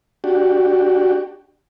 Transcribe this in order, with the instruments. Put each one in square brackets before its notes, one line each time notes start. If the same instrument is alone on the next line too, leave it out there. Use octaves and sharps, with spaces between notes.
[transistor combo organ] D4 F#4 G4